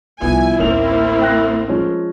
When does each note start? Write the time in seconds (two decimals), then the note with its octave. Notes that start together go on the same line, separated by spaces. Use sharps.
0.22 C2 F3 B3 E4 G#5
0.59 A1 D2 D#3 A#3 C4 C#4 F7
1.21 G5 F#6 A#6
1.68 F3 G#3 C#4